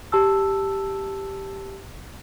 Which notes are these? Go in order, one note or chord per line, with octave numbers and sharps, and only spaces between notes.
G4 A5 E6